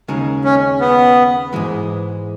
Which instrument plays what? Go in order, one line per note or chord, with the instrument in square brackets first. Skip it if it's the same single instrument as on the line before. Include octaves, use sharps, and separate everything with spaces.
[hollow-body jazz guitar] D#2 C#3 G#3 D#4 G#4
[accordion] C#4
B3
[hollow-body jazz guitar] G#2 E3 G#3